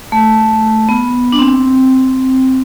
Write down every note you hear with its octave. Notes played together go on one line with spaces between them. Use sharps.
A3
B3
D4
C4